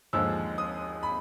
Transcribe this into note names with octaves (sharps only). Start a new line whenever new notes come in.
D#2 D3 F3 G#3 E6
D#6
B5